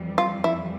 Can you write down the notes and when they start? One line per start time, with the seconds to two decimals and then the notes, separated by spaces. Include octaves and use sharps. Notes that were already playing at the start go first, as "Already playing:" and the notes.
Already playing: F2 E3 G3
0.18 F4
0.44 E4